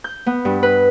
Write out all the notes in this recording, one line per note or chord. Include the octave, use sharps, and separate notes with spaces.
G6
B3
G2
B4